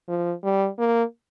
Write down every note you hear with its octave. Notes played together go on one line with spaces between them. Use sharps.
F3
G3
A#3